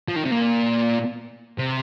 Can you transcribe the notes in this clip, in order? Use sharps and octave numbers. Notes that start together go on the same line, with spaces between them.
F3
D#3
C3
A#2
C3